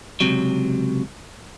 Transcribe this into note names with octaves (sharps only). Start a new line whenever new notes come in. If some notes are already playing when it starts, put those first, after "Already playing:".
C#2 G2 C3 F#3